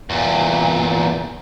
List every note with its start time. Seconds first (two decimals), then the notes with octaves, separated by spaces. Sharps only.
0.10 E2 A#2